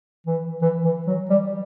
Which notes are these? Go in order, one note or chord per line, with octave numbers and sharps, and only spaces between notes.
E3
E3
E3
F#3
G3